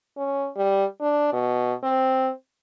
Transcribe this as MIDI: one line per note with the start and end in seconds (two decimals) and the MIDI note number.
0.17 0.48 61
0.56 0.85 55
1.01 1.29 62
1.33 1.74 47
1.83 2.31 60